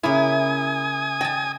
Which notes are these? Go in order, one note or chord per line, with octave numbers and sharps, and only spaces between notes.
C#3 A#3 E4 G#5 D#6
D#5 G5 A5